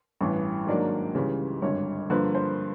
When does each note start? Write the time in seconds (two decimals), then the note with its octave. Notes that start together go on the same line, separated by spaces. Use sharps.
0.21 A1 G2 E3
0.67 G#2 D#3 F#3 A#3 D4 D5
1.14 C#2 C#3 E3 G3
1.62 G#1 G2 D3 C#5
2.10 G2 D3 F3 A#3 B4
2.35 C5